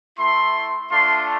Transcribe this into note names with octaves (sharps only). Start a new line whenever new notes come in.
A3 E4 C6
A3 D4 F4 C6